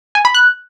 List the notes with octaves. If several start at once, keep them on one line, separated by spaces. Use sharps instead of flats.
G#5
B5
F#6